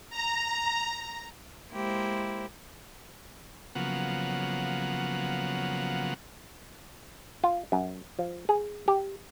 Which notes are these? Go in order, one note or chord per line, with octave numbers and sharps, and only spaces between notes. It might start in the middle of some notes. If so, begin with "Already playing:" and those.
A#5
G#3 A#3 E4 G4 C5
C#3 F3 F#3 A#3 B3 F#5
F4
F#2
F3
G#4
G4